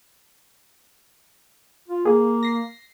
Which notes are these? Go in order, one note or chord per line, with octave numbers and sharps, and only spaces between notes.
F4
A#3 G#4
A#6 C7